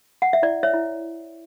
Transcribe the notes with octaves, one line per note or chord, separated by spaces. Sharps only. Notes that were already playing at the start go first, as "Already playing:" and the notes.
F#5
E5
E4 D5
C#5 E5
E4